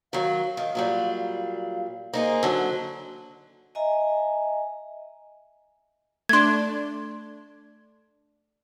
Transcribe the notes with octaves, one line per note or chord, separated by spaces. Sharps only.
D#3 F#3 F5
D#3
A#2 F#3 G3
A#3 D#4 G#4 C5
D3 F#3
D#5 E5 G#5 A#5
A3 D4 C6 G#6